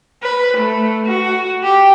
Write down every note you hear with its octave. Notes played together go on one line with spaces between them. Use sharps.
B4
A3
F#4
G4